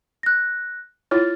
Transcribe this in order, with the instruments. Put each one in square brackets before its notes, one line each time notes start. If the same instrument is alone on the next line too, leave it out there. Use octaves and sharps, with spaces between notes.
[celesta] F#6 A#6
[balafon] E4 F4 C#5 [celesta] F6 A6